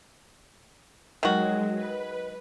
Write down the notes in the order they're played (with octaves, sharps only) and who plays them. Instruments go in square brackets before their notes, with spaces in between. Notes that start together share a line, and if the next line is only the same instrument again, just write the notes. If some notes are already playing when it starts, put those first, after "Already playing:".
[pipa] D#3 F#4 [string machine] F#3 G#3
[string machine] B4